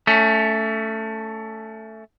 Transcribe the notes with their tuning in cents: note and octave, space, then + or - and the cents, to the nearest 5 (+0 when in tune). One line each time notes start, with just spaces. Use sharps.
A3 +5 C#4 +30